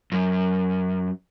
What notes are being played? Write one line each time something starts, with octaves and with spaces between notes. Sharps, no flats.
F#2